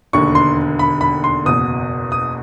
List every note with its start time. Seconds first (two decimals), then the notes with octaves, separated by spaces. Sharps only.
0.13 E1 D#2 D3 C#6
0.35 C6
0.79 B5
1.01 B5
1.24 C6
1.45 F#1 E2 B2 D#6
2.12 D#6